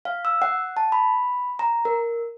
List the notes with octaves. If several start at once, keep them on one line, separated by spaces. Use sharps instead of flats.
F5
E6
F#5
A5
B5
A#5
A#4